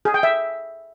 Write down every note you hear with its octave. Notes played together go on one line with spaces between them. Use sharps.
G#4
G5
E5